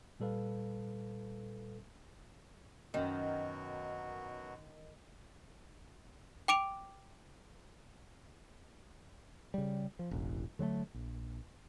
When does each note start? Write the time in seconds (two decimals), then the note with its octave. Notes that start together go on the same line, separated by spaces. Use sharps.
0.20 A#2 G3 A4 B4 F5
2.94 F#2 B2 D#3 F#3 F#4
6.48 G5 D6 D7 F7
9.54 C#3 G3
9.99 F3
10.11 E1 A1
10.59 D3 F#3 G3 A3
10.94 A#1